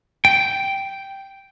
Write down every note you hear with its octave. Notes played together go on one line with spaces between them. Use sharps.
G5